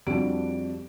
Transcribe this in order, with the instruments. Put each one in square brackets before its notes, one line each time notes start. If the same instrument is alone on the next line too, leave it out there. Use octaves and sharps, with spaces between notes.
[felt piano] F2 G3 D4 F#4 D7